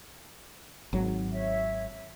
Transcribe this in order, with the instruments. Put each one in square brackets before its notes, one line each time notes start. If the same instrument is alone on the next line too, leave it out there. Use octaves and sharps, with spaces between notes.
[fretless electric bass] G#1 F#3
[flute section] C#5 E5